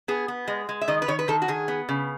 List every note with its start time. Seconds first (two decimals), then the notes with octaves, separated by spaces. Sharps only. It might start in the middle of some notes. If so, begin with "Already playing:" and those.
0.08 B3 G#4
0.28 B3
0.48 G#3
0.69 G#3
0.81 E5
0.88 D#3 D#5
1.02 B4
1.08 D#3 C#5
1.19 B4
1.28 D#3 A4
1.42 F#4
1.48 D#3 G#4
1.68 B3
1.89 C#3